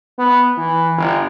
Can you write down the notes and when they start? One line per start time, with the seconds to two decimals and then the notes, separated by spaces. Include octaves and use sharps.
0.18 B3
0.57 E3
0.97 G1